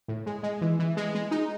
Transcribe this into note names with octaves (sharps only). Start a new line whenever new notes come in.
A2
G#3
G#3
E3
E3
G#3
G#3
D#4